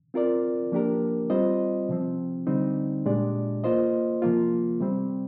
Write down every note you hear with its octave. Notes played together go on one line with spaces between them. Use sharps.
C4 F4 A#4 D5
F3 A#3 D4 G4 A#4
G3 C4 F4 C5 D#5
C3 F3 C4
D3 G3 C4 D#4
A#2 G#3 D4 G4 D5
A#3 F4 C5 D#5
C3 F3 A#3 F4
C3 G3 C4